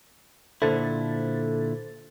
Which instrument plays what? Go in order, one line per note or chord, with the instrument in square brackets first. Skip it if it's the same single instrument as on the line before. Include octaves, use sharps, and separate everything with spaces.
[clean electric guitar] A#2 D3 E4 [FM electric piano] A4 C5 A6